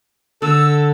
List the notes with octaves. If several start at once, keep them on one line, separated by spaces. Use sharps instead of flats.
D3 A4 E6